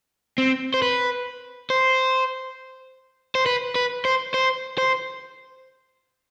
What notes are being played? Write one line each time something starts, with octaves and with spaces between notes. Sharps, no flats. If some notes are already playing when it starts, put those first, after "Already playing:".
C4
C5
B4
C5
C5
B4
B4
C5
C5
C5